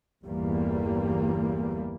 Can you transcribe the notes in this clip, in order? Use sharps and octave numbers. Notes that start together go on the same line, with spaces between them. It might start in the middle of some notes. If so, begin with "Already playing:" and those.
G1 E2 G3 A#3